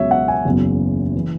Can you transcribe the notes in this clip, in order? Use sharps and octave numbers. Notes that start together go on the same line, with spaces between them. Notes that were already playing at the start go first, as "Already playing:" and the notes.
Already playing: C#2 B2 F#3 C#5 E5
F#5
G#5
F#1 E2 C#3 F#3
E3